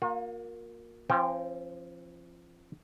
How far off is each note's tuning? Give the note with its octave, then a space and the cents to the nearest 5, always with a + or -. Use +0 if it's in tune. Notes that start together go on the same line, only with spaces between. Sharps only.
A#3 +0 F4 +45
F3 -25 C4 +40 G5 +0